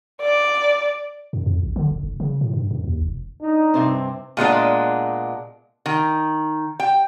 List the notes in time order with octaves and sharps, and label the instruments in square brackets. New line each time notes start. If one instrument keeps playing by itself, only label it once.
[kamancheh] D5
[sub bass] F#2
F2
A1
D3
D1
F1
C#3
A2
G2
F#2
D#2
F1
[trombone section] D4 D#4
[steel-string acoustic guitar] G2 C3 C4
[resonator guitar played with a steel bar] A#2 G#3 B3 D4
D#3
G5